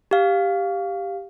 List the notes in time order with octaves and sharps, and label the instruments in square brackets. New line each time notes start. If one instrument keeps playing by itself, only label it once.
[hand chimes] G4 F5